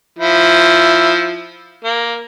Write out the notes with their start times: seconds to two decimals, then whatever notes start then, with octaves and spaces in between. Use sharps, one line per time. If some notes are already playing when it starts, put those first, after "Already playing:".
0.19 F3 E4
1.85 A#3